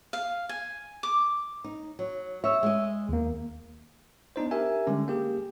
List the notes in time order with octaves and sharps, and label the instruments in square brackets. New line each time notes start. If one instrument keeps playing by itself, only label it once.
[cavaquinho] F5
G#5
D6
[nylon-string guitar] D#4
F#3
[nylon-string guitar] C#5 D#5 [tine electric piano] E5 E6
[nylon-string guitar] G#3 D#5
[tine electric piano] D#2 A#3
B3 D4 D#4 C5
G4 A#4 E5 G#5
D3 G3 G#3 C#4
A#3 G4 G#4